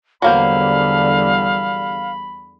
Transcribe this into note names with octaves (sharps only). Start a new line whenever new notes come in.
E2 D3 F#3 G3 A#3 C5 F5 B5